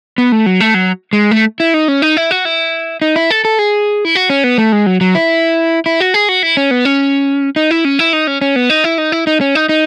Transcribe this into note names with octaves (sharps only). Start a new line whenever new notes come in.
B3
A3
F#3
A3
F#3
G#3
A3
E4
D#4
C#4
D#4
E4
F#4
E4
D#4
E4
A4
A4
G#4
E4
F#4
C#4
B3
A3
G#3
F#3
F#3
E4
E4
F#4
G#4
F#4
E4
C#4
B3
C#4
D#4
E4
C#4
E4
D#4
C#4
C#4
B3
D#4
E4
D#4
E4
D#4
C#4
D#4
D#4